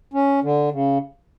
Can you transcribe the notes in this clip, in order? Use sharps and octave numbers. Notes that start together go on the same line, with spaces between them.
C#4
D3
C#3